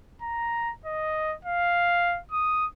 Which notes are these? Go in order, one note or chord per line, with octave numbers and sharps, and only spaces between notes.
A#5
D#5
F5
D#6